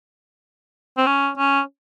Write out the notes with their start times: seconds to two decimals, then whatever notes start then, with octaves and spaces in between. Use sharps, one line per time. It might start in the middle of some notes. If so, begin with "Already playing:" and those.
0.97 C4
1.06 C#4
1.37 C#4